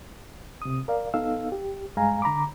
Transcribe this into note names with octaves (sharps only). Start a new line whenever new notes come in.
C3 D#6
A#4 D5 F5
B3 D#4 A4 F5 E6
G4
G2 G#3 F5 G#5 A#5
D3 A#5 B5 D6